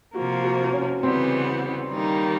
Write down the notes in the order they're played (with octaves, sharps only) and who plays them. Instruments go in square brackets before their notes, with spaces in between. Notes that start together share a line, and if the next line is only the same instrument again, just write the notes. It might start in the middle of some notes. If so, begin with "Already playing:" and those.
[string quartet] C3 F3 A#3 [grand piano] F#4
[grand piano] F#4
C#4
[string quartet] C#3 E3 G3 B3 [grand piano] C4
[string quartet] D#3 G3 A#3 D#4